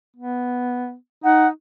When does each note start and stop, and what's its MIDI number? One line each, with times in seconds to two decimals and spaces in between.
0.16 0.95 59
1.24 1.48 63
1.24 1.48 78